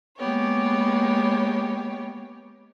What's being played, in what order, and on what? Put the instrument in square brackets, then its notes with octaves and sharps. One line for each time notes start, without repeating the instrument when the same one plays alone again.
[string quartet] G#3 A#3 B3 G4 C#5